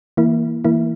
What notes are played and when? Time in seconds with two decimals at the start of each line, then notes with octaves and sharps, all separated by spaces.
0.17 E3 A#3 E4
0.65 E3 A#3 E4